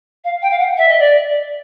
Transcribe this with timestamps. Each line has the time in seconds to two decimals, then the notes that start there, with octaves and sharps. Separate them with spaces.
0.24 F5
0.42 G5
0.50 F5
0.59 F#5
0.77 E5
0.88 D#5
0.99 D5